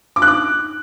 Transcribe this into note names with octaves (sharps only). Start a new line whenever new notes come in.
D6
F#6
D6